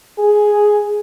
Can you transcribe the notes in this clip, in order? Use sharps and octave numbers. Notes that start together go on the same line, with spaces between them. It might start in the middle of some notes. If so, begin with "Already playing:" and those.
G#4